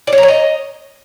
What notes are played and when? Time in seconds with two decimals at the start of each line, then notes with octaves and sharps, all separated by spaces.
0.07 D5
0.13 C#5
0.18 A#5
0.23 C#5
0.28 D#5